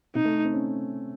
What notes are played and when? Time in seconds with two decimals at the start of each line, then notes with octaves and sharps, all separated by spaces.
0.15 C3 D#4
0.25 A3
0.44 C4
0.53 C#4